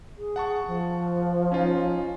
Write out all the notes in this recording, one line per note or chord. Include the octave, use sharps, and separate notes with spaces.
G#4
F#5 A5 C#6
F3
C#4 D#4 F4